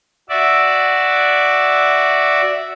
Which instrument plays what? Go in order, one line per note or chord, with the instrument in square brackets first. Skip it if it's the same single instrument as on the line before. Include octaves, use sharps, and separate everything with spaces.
[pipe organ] F#4 D5 E5